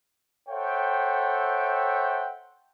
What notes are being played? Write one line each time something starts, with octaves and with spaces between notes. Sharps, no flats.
A4 C5 C#5 E5 F#5 G5